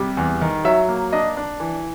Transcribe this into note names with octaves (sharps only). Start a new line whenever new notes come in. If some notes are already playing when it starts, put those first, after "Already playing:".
Already playing: C3 G3
E2
D#3
F#3 E5
A#3
D4 D#5
D4
E3